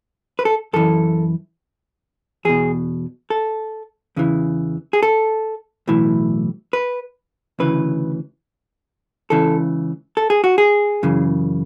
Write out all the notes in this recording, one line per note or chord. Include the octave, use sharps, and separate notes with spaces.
B4
A4
F#2 E3 A4
E2 B2 G#4
A4
E2 C#3 E3
G#4
A4
B1 A2 E3
B4
D2 C#3 E3 B4
C#2 C#3 E3 A4
A4
G#4
F#4
G#4
F#2 C#3 E3